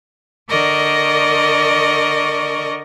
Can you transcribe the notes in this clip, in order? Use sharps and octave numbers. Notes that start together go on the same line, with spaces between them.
D3 A#4 D5 D#5 C#6